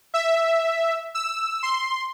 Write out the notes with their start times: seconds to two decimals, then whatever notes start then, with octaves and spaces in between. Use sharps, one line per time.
0.14 E5
1.15 E6
1.63 C6